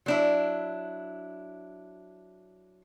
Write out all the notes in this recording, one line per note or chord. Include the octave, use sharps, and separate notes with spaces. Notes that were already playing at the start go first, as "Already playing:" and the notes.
F#3 D4 E4